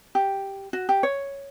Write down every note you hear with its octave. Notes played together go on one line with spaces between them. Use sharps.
G4
F#4
G4
C#5